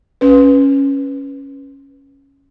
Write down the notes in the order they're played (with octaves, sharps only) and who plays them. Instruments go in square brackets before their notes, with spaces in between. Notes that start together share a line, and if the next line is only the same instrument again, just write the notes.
[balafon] C#4 B4